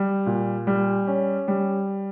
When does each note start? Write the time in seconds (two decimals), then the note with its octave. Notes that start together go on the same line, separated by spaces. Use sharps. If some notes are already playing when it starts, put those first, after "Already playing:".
Already playing: G3
0.26 A#2
0.67 G3
1.07 C#4
1.48 G3